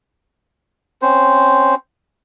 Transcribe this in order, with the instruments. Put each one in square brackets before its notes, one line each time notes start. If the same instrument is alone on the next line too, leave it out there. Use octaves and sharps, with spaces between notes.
[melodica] C4 C#4 C5